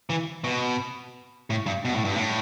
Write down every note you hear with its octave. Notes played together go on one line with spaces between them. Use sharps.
E3
B2
A2
G2
B2
A2
G2
A2